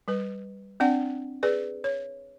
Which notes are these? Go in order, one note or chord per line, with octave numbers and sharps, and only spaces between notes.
G3 B4
C4 D4 D5 F#5
G#4 B4 D5
C#5